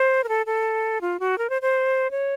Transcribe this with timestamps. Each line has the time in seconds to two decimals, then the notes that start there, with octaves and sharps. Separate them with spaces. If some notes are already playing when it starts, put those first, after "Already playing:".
Already playing: C5
0.24 A#4
0.29 A4
0.46 A4
1.01 F4
1.20 F#4
1.38 A#4
1.50 C5
1.62 C5
2.11 C#5